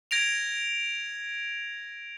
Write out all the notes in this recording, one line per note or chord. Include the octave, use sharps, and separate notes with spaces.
G#6 A#6 D7 F7